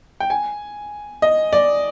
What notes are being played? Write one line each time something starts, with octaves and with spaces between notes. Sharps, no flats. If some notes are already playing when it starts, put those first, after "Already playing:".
G5
G#5
D#5
D5